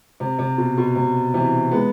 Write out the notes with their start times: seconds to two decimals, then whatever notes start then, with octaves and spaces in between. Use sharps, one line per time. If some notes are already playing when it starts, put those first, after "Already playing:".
0.20 C3
0.39 C3
0.58 B2
0.78 B2
0.96 C3
1.34 C3 E3
1.71 G#3 B3